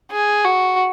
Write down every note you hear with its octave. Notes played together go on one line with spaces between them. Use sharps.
G#4
F#4